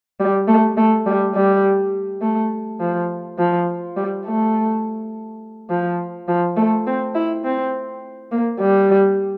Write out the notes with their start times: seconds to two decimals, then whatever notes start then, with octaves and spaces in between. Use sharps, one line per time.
0.20 G3
0.48 A3
0.77 A3
1.06 G3
1.35 G3
2.22 A3
2.80 F3
3.39 F3
3.97 G3
4.26 A3
5.70 F3
6.28 F3
6.57 A3
6.86 C4
7.15 E4
7.44 C4
8.32 A#3
8.60 G3